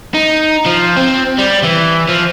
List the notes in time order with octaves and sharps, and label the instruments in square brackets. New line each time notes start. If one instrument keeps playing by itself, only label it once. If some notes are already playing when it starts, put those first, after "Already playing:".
[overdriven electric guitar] D#4
F3
C4
G3
E3
F3